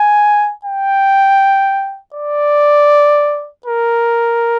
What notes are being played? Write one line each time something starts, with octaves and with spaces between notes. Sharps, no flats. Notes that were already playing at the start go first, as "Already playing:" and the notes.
Already playing: G#5
G5
D5
A#4